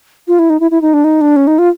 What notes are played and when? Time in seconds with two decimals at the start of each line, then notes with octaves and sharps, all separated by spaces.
0.28 F4
0.39 E4
0.50 D#4
0.60 E4
0.71 E4
0.82 D#4
0.94 D4
1.04 D#4
1.21 D4
1.36 C#4
1.47 D#4
1.59 F4